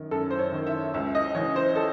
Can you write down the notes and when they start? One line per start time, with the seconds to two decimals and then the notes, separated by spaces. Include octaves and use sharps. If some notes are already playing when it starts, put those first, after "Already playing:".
Already playing: F#2 D#3
0.11 F#2 A4
0.31 C5
0.39 C#5
0.52 D#3
0.67 E5
0.94 C#2 E5
1.15 D#5
1.35 E3 C#5
1.38 C#3
1.56 C5
1.76 A4